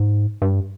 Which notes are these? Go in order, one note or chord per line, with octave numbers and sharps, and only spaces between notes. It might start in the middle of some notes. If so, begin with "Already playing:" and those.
Already playing: G#2
G2